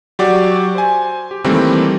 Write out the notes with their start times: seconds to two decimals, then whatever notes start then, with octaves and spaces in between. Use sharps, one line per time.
0.19 F#3 F#4 G4 D5
0.75 C5 G#5
1.31 G4
1.44 D#3 E3 G3 A3 A#3 C4